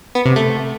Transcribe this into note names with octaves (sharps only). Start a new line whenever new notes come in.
B3
C3
A3